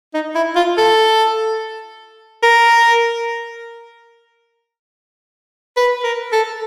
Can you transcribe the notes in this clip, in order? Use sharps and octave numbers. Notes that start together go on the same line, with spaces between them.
D#4
E4
F4
A4
A#4
B4
A#4
A4